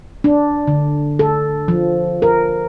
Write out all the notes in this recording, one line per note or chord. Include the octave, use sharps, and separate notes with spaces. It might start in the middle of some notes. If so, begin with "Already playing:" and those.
D4
D3
A4
F3
A#4